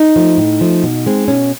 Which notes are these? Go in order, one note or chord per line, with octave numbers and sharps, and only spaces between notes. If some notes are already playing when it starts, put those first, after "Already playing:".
Already playing: D#4
F3 A3
A2
F3 A3
B2
G#3 C4
B2 C#4